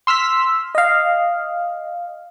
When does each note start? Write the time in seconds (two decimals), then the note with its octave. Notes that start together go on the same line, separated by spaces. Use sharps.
0.07 C6 E6 F6 B6
0.75 D#5 F5